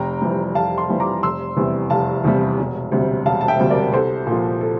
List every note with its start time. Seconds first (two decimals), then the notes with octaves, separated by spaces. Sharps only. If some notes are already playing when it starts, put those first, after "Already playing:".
Already playing: F1 G5 A#5
0.22 F2 E3 G3
0.55 F1 F5 A5
0.78 A5 C6
0.89 F2 E3 G3
1.00 A#5 D6
1.23 F1 C6 E6
1.56 E2 C3 E3 G3
1.90 F1 F5 A5
2.24 E2 C3 E3 G3
2.58 E1
2.92 D2 C3 G3
3.26 E1 F5 A5
3.41 A5
3.48 E5 G5
3.59 D2 C3 G3
3.70 A#4 D5
3.93 C2 A4 C5
4.27 A#2 F3
4.61 A4